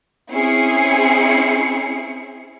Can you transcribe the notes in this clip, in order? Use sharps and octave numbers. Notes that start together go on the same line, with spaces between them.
C4 C#4 E4 G#4 C7 C#7